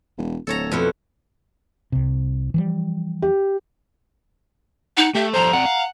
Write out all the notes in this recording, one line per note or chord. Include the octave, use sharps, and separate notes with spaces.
E1
D1 A4 C#5 A#5
F2 B2 E4
C2 C3
E3 F3 G3
G4
D#4 F#5
A3 G4 E5
F3 G3 A4 C5 A#5
C4 D5 F#5 G5
F5